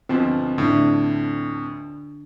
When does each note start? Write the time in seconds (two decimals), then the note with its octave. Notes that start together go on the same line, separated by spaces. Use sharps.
0.09 D2 B2 F3 C4
0.58 A2 D3 D4